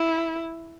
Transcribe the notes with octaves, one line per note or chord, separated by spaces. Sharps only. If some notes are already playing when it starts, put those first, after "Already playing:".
Already playing: E4